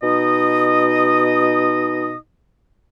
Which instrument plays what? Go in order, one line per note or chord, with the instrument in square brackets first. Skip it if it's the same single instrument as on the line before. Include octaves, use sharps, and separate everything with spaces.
[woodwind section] B2 D#4 D#5 D#6